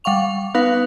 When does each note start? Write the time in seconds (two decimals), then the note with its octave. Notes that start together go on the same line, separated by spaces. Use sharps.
0.04 G3 F5 F#5 C#6 F7
0.54 B3 D#4 B4 F5